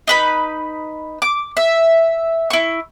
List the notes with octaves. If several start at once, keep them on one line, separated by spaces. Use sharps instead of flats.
D#4 B4 B5
D6
E5
E4 C#6